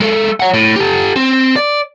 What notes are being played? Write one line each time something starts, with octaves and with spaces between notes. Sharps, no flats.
G#3 A4
C#5 F#5
A2
G4 A4
C4
D5